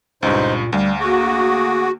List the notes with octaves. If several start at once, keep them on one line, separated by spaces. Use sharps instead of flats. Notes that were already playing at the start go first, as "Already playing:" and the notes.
C#2 G2 A#2 D#4 C5
D2 G3 F5
A#3 F#4 G#4 D6 D#6